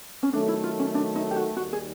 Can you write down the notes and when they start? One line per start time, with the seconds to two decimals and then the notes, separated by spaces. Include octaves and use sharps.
0.23 C#4
0.33 D#3 F#3 A3 D4
0.48 E4
0.64 F4
0.79 C#4
0.95 D4
1.16 D#4
1.31 G4
1.36 F#4
1.57 D#2 D#3 G3 F#4
1.73 G#4